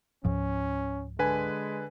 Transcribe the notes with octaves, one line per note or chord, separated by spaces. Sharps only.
C#2 G#2 F3 C#4
D3 G#3 B4 G#5